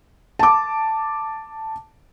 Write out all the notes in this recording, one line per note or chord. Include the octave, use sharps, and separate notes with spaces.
A5 D6